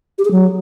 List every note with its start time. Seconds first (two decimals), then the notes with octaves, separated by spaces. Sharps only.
0.18 G4
0.25 G#4
0.31 F#3